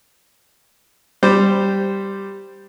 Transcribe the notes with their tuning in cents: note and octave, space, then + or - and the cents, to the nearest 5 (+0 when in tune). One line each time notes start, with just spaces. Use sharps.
G3 +0 G4 +0 C5 -10